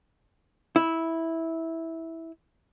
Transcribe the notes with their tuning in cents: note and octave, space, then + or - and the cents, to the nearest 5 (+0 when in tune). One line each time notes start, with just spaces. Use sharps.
E4 -10